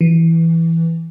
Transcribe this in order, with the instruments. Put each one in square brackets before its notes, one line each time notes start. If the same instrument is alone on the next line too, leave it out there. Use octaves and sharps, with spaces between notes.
[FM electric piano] E3